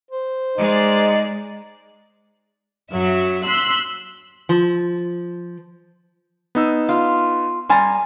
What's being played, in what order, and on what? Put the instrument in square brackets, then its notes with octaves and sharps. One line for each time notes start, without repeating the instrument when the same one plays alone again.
[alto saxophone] C5
[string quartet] G#3 D5 [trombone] D#4
[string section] F#2 F#3 E5
C6 E6 F#6 B6
[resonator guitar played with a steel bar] F3
[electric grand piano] B3 D#4 E6
[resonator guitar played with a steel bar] F4
[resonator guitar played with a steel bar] G3 G#5 A#5 [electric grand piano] C6 A6